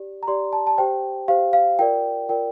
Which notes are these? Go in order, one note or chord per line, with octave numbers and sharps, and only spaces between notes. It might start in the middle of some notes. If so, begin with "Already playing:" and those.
Already playing: G4 D5
A#5
G4 D5 C6
A5
A5
G4 C5 G5
G4 C5 F5
F5
F4 A#4 D5 G5
F4 A#4 D5 G5